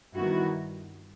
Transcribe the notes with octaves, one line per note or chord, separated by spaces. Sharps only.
G2 D#3 G3 B3 E4 F#4